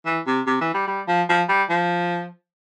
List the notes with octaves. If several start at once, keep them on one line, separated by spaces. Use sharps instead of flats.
E3
C3
C3
E3
G3
G3
F3
F3
G3
F3